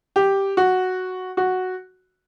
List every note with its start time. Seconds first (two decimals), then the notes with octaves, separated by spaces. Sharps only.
0.16 G4
0.57 F#4
1.37 F#4